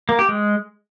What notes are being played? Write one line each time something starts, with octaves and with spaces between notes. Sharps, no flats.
A#3
G4
G#3